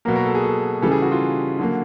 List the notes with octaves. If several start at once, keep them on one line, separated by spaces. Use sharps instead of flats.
B2 F#3 A#3 A#4
A#4
A4
G#4
A4
C#3 E3 G3 A4
G#4
F#4
F4
D3 F#3 A#3